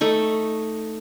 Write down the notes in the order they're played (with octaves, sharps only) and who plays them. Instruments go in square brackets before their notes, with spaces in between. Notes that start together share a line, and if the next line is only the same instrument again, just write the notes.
[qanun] A3 D#4 C#6